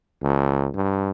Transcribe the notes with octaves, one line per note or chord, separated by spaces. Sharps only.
C#2
G2